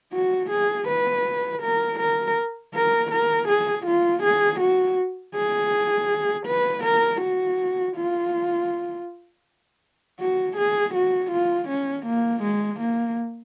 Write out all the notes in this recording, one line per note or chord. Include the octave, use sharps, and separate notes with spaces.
F#4
G#4
B4
A#4
A#4
A#4
A#4
G#4
F4
G#4
F#4
G#4
B4
A#4
F#4
F4
F#4
G#4
F#4
F4
C#4
A#3
G#3
A#3